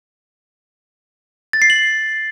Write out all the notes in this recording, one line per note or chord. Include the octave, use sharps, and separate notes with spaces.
A6
C7
F#7